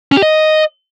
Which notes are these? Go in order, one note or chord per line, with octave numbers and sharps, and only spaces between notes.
C#4
G4
D#5